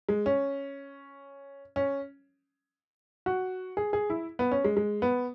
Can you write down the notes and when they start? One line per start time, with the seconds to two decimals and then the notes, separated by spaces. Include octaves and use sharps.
0.09 G#3
0.26 C#4
1.76 C#4
3.26 F#4
3.77 G#4
3.93 G#4
4.10 E4
4.39 B3
4.51 C#4
4.64 G#3
4.77 G#3
5.02 B3